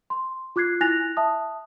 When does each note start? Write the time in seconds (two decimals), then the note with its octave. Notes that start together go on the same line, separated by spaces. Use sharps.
0.10 C6
0.56 F4 D6 F#6 G#6 C7
0.81 E4 G#5 F#6 A6 A#6 F7
1.17 E5 A5 D#6